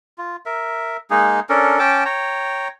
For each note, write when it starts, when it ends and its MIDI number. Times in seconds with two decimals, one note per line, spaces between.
0.18 0.36 65
0.46 0.97 70
0.46 0.97 76
1.10 1.40 56
1.10 1.40 58
1.10 1.40 63
1.10 1.40 68
1.49 1.79 61
1.49 1.79 62
1.49 1.79 69
1.49 1.79 70
1.79 2.04 61
1.79 2.04 79
1.79 2.04 81
1.79 2.04 86
2.05 2.68 73
2.05 2.68 79
2.05 2.68 82